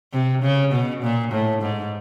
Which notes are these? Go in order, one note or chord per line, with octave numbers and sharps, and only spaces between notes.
C3
C#3
B2
A#2
A2
G#2